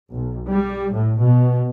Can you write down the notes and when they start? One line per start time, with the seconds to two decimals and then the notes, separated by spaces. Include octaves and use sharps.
0.11 B1
0.51 G3
0.93 A2
1.22 B2